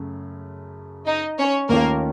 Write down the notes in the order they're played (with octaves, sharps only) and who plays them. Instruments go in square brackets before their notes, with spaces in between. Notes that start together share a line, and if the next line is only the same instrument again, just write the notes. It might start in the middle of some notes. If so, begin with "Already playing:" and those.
Already playing: [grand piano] F#2 C#3 A3
[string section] D#4 D#5
C#4 C#5
[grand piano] D#2 D#3 A3 C#4 F4 [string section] A#3 A#4